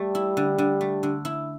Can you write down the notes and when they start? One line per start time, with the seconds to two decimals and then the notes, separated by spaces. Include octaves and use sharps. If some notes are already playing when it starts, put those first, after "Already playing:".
Already playing: G3 A3
0.15 E4
0.37 D3
0.58 D3
0.81 A3
1.03 D3
1.25 E4